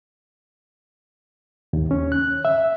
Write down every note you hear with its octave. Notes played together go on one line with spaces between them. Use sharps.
D#2
C#4
F#6
E5